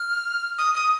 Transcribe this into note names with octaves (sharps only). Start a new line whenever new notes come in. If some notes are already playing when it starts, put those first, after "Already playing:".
Already playing: F6
D#6
D#6